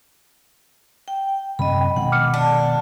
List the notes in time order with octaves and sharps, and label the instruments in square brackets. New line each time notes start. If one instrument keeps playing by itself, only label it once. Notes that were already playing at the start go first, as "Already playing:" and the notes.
[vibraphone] G5
[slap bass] F#2 C3 [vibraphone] D#5 B5
[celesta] G5
[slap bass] B2 D#3 G#3 [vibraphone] F#5
[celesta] D6 F6 C#7
[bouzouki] D4